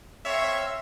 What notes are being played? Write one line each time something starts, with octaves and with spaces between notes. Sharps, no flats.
C4 A4 C#5 E5 F5